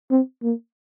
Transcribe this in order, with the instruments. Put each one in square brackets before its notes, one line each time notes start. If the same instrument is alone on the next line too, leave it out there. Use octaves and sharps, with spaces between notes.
[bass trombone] C4
A#3